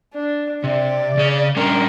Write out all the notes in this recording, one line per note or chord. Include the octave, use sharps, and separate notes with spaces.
D4
C3 D5
C#3 G#4
G3 C#4 D4 A#4